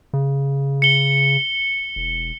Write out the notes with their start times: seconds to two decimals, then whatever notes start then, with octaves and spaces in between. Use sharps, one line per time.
0.13 C#3
0.82 C#7 G7
1.96 E1